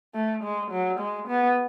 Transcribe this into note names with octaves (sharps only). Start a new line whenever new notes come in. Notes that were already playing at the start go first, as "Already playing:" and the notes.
A3
G#3
F#3
G#3
B3